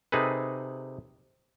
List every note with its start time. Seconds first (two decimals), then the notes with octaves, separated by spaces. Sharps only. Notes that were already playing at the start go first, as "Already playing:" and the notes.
0.12 C3 D#4 G#4 A4 B4